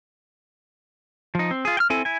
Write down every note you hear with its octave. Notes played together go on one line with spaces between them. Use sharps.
F3 D#4
C4
F4 G#4
G5 F6
C4 E4 A4 G#5
E4 G#5